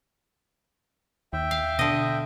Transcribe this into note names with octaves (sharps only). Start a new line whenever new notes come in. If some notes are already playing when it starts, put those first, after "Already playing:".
D#2 E5 G5
F5
B2 D3 D#5